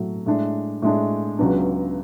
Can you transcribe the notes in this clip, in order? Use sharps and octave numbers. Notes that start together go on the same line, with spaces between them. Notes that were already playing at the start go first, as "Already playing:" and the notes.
Already playing: A2 F#3 A3
A2 G#3 D4
A2 G#3 D4
C#2 C#3 F#3 B3 D4